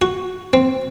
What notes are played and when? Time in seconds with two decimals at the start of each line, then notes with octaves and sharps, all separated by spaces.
0.02 F#4
0.53 C4